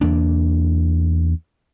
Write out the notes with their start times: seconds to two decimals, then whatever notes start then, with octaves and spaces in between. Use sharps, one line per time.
0.01 E2 A#3 D4